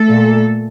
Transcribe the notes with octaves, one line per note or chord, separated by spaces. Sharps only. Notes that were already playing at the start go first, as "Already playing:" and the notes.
Already playing: A3 A4
A#2